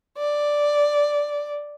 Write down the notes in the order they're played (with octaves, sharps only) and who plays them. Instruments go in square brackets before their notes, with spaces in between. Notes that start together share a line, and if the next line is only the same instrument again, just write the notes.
[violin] D5